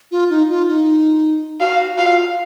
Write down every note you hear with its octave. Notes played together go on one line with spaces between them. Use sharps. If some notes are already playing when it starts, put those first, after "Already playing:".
F4
D#4
F4
D#4
F#4 F5
F4 F5